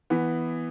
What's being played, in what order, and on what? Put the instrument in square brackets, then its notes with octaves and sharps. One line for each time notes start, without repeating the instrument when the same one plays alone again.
[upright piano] E3 B3